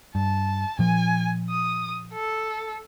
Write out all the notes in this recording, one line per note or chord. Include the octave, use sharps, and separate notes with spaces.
G2 A5
A#2 F3 G#5
D#6
A4